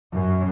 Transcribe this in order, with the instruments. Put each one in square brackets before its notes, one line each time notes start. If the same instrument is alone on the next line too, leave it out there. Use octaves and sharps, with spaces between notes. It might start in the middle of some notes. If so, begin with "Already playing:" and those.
[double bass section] F#2